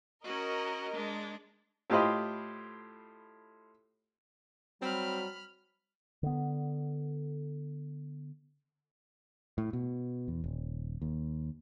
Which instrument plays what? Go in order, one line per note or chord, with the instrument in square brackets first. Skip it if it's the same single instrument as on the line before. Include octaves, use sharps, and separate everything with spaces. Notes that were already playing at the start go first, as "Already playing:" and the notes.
[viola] C#4 F#4 [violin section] A#4 D#5
[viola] G#3 D4
[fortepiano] A2 F4 G4 C5 D#5 B5
[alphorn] F#3 [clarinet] G3 [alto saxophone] C4 [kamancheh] B5 F6
[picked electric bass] D3 B3
[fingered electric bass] A2
B2
E2
D#1
D#2